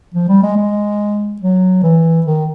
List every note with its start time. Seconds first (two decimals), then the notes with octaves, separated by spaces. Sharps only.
0.14 F3
0.29 G3
0.43 G#3
0.57 G#3
1.42 F#3
1.83 E3
2.26 D#3